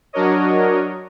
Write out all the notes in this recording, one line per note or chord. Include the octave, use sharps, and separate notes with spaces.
F#3 D4 F#4 A#4 C#5 D#5